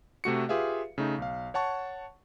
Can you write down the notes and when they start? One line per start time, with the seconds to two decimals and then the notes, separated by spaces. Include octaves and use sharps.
0.24 C3 A3 F#4 C#7
0.49 F4 G4 G#4 B4 E5 F5
0.98 C#3 A3 D#4
1.18 B1 F5
1.54 C#5 F#5 A5 C#6